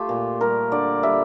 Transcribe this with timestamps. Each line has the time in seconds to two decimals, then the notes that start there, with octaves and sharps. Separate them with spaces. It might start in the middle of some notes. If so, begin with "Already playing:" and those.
Already playing: A3 F4 G4
0.09 A#2
0.40 G3 A#4
0.72 D3 D5
1.03 G3 E5